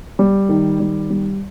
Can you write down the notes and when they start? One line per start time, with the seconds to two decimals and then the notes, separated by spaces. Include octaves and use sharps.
0.19 G3
0.49 D#3
0.80 G3
1.10 G3